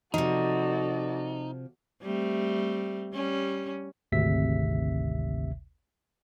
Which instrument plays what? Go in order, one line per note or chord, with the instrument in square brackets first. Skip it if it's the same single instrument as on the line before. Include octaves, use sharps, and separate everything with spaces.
[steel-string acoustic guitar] C3 F3 [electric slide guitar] D#4 [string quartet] F#4 A4 D5
[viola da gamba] G3 A3 C4
G3 C#4
[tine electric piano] G#1 D2 C3 E5 B6